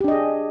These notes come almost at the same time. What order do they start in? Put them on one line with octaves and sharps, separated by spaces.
G4 D4 D#5 G#4